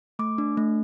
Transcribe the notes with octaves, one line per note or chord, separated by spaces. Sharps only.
A3 D6
D4
A3